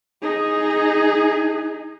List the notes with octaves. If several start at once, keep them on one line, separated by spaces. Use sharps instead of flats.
D#4 G#4